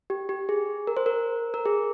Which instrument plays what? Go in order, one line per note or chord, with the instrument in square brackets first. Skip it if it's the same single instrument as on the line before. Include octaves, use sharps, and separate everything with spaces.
[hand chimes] G4
G4
G#4
A#4
C5
A#4
A#4
G#4